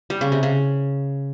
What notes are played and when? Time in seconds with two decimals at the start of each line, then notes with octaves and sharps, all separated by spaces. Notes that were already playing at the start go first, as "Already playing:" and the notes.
0.10 G3
0.21 C#3
0.32 C3
0.43 C#3